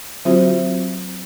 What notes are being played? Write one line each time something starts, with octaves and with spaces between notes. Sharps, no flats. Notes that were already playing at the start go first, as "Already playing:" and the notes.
D3 F#3 C4 F4 F#4 C5